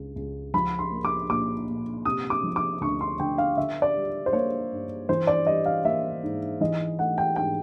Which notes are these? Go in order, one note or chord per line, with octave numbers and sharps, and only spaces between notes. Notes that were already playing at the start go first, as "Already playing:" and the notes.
Already playing: C#2
C#2
F3 B5
C6
A#3
D6
A#2 D6
A#2
C3 D#6
D6
F3
D6
D2 C#6
C6
D2 G5
F5
D3 E5
D5
G3
C5
A#3 C#5
G2
E3 C5
D5
G3 D#5
F5
A#3 E5
G#2
E3 D#5
A3 F#5
G5
G#2 G5